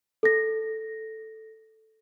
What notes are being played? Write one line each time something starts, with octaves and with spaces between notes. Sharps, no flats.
A4 A#6